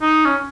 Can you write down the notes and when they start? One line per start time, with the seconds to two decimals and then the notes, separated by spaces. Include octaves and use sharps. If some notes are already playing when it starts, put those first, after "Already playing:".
0.02 D#4
0.25 C#4